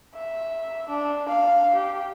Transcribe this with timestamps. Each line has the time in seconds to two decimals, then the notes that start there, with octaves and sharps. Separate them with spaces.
0.15 E5
0.89 D4
1.28 F5
1.75 G4